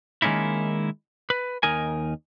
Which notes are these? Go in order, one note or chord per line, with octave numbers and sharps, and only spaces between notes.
D#3 G#3 A#3 C#4 D#4 E4
B4
D#2 D#4 A#4 G#5